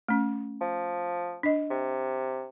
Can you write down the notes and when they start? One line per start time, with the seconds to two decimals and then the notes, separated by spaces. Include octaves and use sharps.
0.08 A3 C#4
0.61 F3
1.43 D4 D#5
1.70 C3